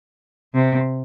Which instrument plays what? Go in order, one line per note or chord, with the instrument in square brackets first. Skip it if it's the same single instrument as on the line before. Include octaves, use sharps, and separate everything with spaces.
[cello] C3